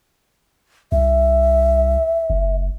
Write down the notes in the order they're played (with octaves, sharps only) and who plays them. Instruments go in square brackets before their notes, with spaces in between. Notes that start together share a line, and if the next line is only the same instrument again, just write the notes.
[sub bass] C2 [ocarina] E5
[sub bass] F#1